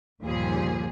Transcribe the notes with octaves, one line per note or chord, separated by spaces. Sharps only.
G1 D#2 A#2 F3 G3 G#4